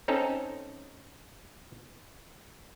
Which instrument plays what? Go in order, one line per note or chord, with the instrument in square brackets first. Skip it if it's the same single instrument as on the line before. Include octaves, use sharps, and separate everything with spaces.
[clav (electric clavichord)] C4 C#4 D#4 A4 A#5